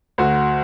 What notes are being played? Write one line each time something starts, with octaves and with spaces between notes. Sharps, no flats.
D2 F#4